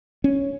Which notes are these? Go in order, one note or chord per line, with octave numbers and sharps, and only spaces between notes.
C#4